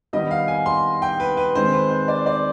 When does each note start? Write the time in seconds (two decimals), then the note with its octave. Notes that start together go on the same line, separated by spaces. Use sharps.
0.13 D#3 G3 B3 D#5
0.31 F5
0.48 G#5
0.66 C6
1.02 G5
1.20 B4
1.37 B4
1.55 D#3 G#3 C4 C5
1.73 B4
1.91 C5
2.08 D5
2.26 D5